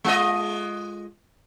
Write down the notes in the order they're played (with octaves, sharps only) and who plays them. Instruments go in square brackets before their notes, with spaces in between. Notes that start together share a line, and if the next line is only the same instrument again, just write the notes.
[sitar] G#3 F4 D#5